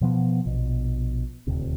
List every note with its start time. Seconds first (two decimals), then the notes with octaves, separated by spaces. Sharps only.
0.01 B2 F3 B3
0.46 A#1 B2
1.47 D#1 D2 C3